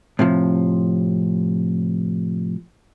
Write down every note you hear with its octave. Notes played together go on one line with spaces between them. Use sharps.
A2 C3 F3